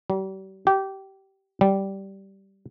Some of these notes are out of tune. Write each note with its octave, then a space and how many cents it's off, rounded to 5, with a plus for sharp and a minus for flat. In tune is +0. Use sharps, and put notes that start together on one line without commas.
G3 -40
G4 -20
G3 -10